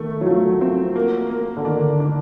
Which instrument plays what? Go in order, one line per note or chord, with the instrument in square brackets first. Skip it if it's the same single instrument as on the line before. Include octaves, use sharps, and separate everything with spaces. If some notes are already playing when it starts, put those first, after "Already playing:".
Already playing: [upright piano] D#3 [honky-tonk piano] A3
[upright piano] F#3
[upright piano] F3 [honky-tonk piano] A3
[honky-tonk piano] C4
A#3
A#3
[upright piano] D3
[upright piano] D#3 [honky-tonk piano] D4
[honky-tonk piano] D4